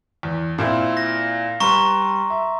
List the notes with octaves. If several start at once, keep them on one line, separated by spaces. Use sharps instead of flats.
E2
A#2 C4 E4
A#6
G3 B4 A#5 C6 C#6
E5